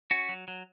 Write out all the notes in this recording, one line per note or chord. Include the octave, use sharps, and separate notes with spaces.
C#4 F#4
F#3
F#3